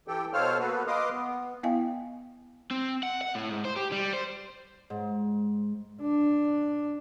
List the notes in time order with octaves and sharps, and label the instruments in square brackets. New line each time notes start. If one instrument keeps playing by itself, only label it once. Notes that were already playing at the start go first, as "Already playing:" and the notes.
[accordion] E3 G4 A4 G5
B2 A4 C5 C#5 F5 F6
A#3 B3 F#4 A4 B4
B4 D#5 F5 C6 D6 D#6
B3
[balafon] B3 E4 D#5 F5 G5 G#5
[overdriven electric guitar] C4
F#5
F#5
A2
G#2
C5
G4
G3
C5
[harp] G#2
[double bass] D4